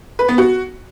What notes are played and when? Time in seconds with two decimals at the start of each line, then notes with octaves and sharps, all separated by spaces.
0.19 B4
0.29 B3
0.38 F#4